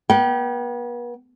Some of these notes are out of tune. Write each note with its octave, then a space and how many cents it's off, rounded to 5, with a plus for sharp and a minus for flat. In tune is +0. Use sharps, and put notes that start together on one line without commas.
B3 -40 G5 -20